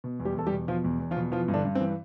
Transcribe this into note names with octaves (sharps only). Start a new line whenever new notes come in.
B2
E2
G3 G4
E2 A4
G3 G4
B2
B2 F3 F4
E2
E2
F3 F4
B2
E3 F3 F4
G2
D3 D4
G2
C4
E3